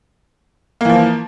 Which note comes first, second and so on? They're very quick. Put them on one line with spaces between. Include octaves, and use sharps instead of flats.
A#3 E3 F3